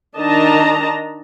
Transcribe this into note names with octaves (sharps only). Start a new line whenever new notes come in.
D#3 D4 D#5 A5 A#5